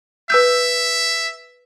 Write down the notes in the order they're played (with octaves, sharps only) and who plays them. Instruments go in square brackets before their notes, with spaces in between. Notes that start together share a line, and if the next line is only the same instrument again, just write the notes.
[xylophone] B4 E6 G6 [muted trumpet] E5